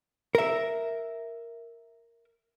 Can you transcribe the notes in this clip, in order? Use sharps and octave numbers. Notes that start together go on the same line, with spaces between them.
A#4 E5